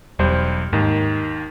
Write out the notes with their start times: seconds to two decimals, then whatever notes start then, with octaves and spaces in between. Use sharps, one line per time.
0.19 E1 B1 G3 C5
0.73 D#2 G#2 D#3